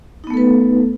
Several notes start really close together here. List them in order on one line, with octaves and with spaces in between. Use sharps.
D#4 B3 A3 A4 B4